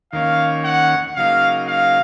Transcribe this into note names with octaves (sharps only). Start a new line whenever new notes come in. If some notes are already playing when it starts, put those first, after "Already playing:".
D#2 D#3 A#3 C#4 F5
F#5
C#3 F#3 A#3 D#4 F5
F5